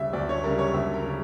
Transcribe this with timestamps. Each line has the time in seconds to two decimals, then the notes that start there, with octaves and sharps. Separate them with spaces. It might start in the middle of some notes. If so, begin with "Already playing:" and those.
Already playing: D2 C#3 G3 E5
0.13 D2 D5
0.29 C#5
0.43 C#3 G3 A#4
0.59 C#5
0.74 D2 E5
0.94 A#4
1.04 C#3 G3